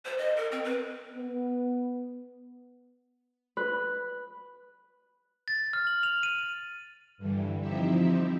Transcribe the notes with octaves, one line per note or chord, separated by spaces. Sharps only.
C5
D#5
A#4
C4
B4
B3
B4
A6
F6
F#7
F7
D#7
G2 D3 E3 G3
F3 C4 D#4 E4 G4 E5